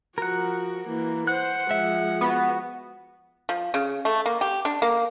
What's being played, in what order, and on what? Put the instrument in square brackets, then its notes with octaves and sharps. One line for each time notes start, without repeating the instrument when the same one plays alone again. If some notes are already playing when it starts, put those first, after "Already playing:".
[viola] F3 F#4 [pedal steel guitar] A#4 F#5
[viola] E3 A#3
[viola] C5 [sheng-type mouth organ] F#5 [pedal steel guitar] F#6
[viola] F3 G#3 [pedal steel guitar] E5
[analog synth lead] B3 [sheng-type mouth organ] F#4
[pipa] F3
C#3
A3
A#3
G4
D4
A#3